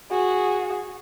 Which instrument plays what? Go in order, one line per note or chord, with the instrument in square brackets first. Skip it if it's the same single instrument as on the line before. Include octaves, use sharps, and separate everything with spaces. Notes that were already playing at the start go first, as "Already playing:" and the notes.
[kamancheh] F#4 G#4